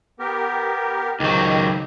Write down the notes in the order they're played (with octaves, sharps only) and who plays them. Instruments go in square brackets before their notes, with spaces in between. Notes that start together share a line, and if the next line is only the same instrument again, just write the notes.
[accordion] B3 G4 A#4
[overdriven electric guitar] C#2 F#3 [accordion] C3 G4 [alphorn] D#3